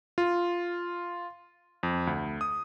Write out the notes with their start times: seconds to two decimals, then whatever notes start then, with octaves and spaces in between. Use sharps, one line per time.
0.18 F4
1.83 F2
2.07 D2
2.41 D#6